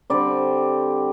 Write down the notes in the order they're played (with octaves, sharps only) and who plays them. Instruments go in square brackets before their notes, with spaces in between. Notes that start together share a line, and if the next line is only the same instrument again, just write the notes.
[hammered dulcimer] D3 G3 C4 D5